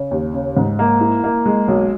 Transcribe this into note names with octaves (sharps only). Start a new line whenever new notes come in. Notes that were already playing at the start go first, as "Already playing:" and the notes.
Already playing: C#3
D#2
C#3
G#2
A#3
E4
A#3
G#3
B1